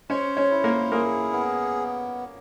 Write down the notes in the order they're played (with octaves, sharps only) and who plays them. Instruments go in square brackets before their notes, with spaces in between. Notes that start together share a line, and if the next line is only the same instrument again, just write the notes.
[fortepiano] C#4 C#5 [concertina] C5
[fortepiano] C#4 C#5
[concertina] E4
[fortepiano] A#3 A#4
[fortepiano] A#3 A#4 [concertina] G#4
[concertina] B3